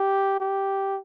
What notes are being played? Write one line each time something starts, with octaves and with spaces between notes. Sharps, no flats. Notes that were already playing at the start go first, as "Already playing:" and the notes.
Already playing: G4
G4